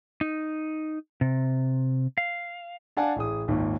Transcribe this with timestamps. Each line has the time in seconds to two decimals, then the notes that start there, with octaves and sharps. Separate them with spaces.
0.21 D#4
1.21 C3
2.18 F5
2.97 D4 D5 F5 F#5 G#5 A5
3.16 A1 G#4 D#6
3.48 G#1 D#2 A#2